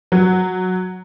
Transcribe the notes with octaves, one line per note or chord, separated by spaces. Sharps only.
F#3